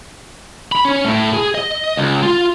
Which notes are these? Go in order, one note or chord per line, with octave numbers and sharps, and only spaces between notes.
B5
C#4
A2
G#4
D#5
C#2
F4